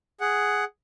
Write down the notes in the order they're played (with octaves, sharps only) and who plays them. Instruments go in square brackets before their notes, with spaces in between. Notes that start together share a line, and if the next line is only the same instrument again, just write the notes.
[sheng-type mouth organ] G#4 F#5